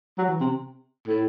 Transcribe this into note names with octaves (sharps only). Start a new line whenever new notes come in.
F#3
E3
C3
A2